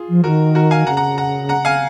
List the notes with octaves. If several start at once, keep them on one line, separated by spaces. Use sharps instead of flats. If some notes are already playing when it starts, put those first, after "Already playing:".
Already playing: F4 G#4
F3
D#3 F#4 A#4
F#4 A#4
F5 G#5
C#3 F#5 A#5
F#5 A#5
F#5 A#5
F#5 A#5
F5 G#5